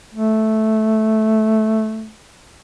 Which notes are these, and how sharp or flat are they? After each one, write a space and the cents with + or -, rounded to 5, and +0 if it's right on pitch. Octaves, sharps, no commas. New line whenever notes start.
A3 -10